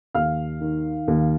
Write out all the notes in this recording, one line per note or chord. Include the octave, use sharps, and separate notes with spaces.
D#2 F5 F6
D#3
D#2